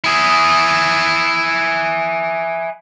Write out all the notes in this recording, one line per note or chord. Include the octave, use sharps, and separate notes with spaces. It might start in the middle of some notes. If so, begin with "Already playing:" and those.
E4 G#4